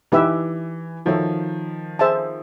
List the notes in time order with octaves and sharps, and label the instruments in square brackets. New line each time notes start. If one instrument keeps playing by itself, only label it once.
[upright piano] E3 [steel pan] D#4 G4 B4 E5
[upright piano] D#3 F3 [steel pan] F#4 A4 C#5 E5
[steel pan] G#4 C5 E5 A5